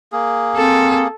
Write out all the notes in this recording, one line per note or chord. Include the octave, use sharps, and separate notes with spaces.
A#3 G#4
C4 A4